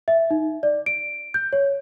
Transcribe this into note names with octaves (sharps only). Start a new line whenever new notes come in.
E5
D#4
D5
D7
G6
C#5